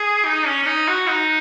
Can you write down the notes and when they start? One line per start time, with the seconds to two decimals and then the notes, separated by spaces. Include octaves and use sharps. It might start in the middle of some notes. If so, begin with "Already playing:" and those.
Already playing: G#4
0.25 D#4
0.46 C#4
0.62 C#4
0.66 D#4
0.88 F#4
1.08 D#4